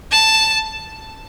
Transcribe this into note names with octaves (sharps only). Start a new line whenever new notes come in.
A5